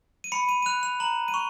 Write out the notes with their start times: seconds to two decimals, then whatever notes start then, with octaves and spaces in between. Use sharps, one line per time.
0.24 D#7
0.32 B5 C#7
0.49 D#7
0.62 D#7
0.66 F#6 F7
0.83 F7
1.00 A#5 F#7
1.28 D#7
1.34 C#6 F7